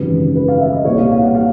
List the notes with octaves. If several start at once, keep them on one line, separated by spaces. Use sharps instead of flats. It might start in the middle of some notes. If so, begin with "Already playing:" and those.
Already playing: G#1 F#2 C#3 E3 G3 B4
B4
F5
E5
D#5
C2 A#2 G3 C#5
F5
F5
F#5
F5